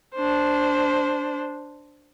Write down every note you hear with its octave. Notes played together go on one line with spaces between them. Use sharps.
D4 C5